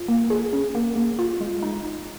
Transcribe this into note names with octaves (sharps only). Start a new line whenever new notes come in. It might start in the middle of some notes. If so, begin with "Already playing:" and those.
Already playing: F4
A#3
G#4
C#4
A#3
A#3
F4
G#3
D#4